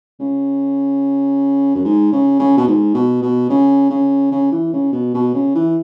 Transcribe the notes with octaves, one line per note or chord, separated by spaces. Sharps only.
C#3
F#2
G#2
C#3
C#3
B2
G#2
B2
B2
C#3
C#3
C#3
E3
C#3
B2
B2
C#3
E3